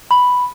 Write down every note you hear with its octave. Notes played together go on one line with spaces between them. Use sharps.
B5